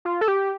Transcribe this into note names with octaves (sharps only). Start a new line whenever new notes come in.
F4
A4
G4